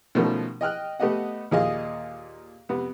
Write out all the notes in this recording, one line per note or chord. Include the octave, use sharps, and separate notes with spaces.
B2 D#3 F3 A3 C#4 A#4
D#5 G5 F6 F#6
A3 B3 G4 D#5 F#5
D#2 A#2 G#4 D#5 F5
F2 C3 B3